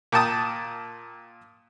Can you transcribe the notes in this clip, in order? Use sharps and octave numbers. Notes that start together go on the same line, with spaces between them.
A#2 G5 A5 D#6